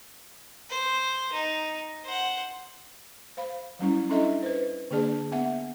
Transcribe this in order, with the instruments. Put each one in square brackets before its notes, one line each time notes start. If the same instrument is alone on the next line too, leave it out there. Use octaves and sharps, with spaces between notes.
[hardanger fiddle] C5
D#4
C5 F#5
[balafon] C5 F5 B5
F#3 G3 C#4 E4
C#4 D4 E4 A4 D#5 E5
B4 C5
D3 A#3 D4 G#4 D5 A5
B3 E5 F#5